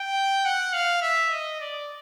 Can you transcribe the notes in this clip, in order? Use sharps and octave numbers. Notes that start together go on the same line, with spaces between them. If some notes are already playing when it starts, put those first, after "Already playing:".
Already playing: G5
F#5
F5
E5
D#5
D5